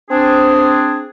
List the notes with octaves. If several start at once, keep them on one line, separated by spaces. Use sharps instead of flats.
C4 D4 G#4